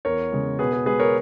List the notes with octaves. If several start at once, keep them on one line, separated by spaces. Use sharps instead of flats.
E2 A#4 C#5
C#3 G#3
B2 G#4 B4
G#4
G#3 G#4 B4
A#4 C#5